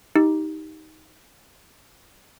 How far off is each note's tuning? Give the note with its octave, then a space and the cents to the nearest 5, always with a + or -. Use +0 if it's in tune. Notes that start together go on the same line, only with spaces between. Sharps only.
D#4 +15 G4 +0